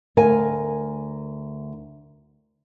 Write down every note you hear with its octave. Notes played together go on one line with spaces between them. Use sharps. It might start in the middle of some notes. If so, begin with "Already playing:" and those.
D2 A#4 G#5